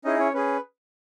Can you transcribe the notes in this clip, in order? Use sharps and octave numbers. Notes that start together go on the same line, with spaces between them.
C#4 D#4 E4 G#4 D#5
C#4 C#5
C#4 G#4 B4